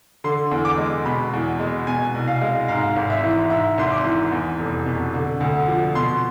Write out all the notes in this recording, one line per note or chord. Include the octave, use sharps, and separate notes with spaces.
D3 C6
E2
D6
G#3
B2 B5
E2
G#3
B2 G#5
C2
F5
G#3
G#2 F5
G#1
E5
E3
G#2 E5
G#1 C6
D6
E3
E2
F1
B2
D3
D2
F3
B2 C6